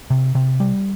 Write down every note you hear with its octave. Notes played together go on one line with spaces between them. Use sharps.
C3
C3
G3